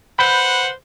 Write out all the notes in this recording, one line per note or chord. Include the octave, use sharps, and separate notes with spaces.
B4 C5 F#5 B5 G6